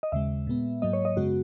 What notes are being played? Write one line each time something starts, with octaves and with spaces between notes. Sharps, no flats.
D#5
D#2 C#3 G#3 E5
A#2 G#3 B3
G#2 F#3 A#3 D#5
C#5
D#5
F#2 C#3 G#3 B3 F#4